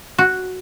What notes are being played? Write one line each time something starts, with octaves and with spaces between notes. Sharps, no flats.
F#4